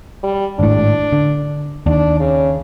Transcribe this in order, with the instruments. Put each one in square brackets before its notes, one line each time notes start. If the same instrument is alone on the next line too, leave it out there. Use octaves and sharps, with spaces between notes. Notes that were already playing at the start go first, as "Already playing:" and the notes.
[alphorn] G3
[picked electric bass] G#1 A2 [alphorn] D4
[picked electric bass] D3
[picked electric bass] D#2 [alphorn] D4
[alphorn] C#3